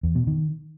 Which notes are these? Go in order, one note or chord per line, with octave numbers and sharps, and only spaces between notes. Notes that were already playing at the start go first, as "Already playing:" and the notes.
E2
B2
D#3